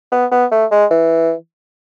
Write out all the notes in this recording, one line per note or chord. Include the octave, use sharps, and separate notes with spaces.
B3
B3
A3
G#3
E3